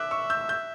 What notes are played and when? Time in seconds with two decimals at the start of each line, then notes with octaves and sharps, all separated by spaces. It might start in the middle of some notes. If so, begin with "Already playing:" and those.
Already playing: E5 D6 F#6
0.11 C#6 E6
0.30 E6 G6
0.49 E6 G6